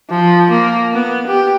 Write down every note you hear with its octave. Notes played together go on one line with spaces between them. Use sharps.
F3
A#3
B3
G4